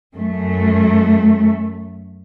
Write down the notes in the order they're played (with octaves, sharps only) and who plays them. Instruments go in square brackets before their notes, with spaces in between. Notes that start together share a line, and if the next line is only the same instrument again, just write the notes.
[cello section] F#2 A3